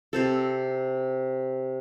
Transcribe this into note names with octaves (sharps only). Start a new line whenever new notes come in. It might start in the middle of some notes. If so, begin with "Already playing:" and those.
C3 C4 A4